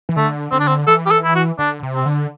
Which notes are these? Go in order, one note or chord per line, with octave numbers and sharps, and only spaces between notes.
E3
D3 A3
D3 C4
D4
C4
E3 A4
G4
A4
E4
F#4
D3 D4
C3
C4
D3